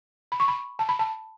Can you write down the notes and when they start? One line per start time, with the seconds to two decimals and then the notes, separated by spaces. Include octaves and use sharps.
0.32 B5
0.40 C#6
0.48 B5
0.79 A5
0.89 B5
0.99 A5